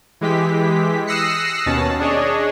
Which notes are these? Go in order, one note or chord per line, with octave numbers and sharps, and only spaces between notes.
E3 G#3 G4 B6
D#6 E6 F#6 A#6 C7 C#7
D#2 B2 C#4 A5
D4 G#4 C#5 D#5